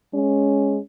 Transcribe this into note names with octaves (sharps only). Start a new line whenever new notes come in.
G#3 C#4